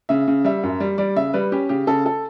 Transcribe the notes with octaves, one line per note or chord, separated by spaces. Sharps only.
C#3 E5
C#3
G3 E5
F#2
G3
G3 D5
C#3 E5
G3 B4
C#4 G4
C#3 G4
C#3 A4
A4